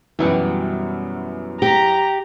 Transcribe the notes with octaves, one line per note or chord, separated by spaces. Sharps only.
F#2 B2 E3 F#3 G3
G4 A#5